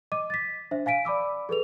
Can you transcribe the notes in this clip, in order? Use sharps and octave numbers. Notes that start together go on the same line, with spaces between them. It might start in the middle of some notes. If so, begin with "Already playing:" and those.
D#5 D6 D#7
A6 B6
D4 C5 E5
F5 G#5 B6 D7 D#7
D5 B5 D6 E6
G#4 A4 B4 F7